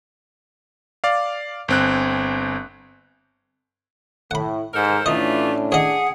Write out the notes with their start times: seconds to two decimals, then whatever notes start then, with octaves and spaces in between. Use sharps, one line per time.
1.04 D5 F5
1.68 G1 C4 F#6
4.31 A2 F#5 B5
4.74 G#2 A4 A#4 C5
5.06 A2 E3 A3 C#4 D4 F4 D#5
5.72 G#4 C#5 D#5 F#5